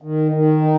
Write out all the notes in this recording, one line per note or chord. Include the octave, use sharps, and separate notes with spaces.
D#3
D#3
D#4